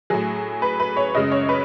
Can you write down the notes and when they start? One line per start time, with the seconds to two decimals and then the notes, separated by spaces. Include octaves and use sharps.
0.10 A2 F#3 G#4
0.62 B4
0.80 B4
0.96 C#5
1.14 F#2 C#3 G#3 D#5
1.31 C#5
1.49 B4